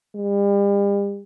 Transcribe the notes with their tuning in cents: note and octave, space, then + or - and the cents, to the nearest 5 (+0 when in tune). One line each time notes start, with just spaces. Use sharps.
G3 +40